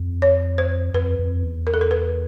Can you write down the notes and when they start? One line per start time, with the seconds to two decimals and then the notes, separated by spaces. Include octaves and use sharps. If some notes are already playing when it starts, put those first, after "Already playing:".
Already playing: F2
0.22 C#5
0.58 C5
0.94 F2 B4
1.19 F2
1.43 E2
1.67 A#4
1.74 A4
1.81 A#4
1.91 B4